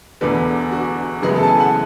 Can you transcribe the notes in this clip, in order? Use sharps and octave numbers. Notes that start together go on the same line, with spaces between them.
E1 E2 D3 B4
F#4
F#2 C#3 E3 G#3 B3 G#4
A4
A5
G#5
F#5